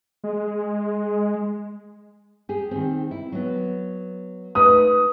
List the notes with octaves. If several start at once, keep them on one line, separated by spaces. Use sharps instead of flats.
G#3
G4 G#4
D#3 C4
E4
F#3 B3
A3 D#4 B4 D#6